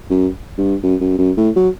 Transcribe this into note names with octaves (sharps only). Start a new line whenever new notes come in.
F#2
G2
F#2
F#2
F#2
A2
F#3